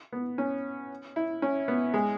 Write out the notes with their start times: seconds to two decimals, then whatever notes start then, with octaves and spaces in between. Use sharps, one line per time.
0.12 B3
0.38 C#4
1.16 E4
1.42 C#4
1.68 B3
1.94 G#3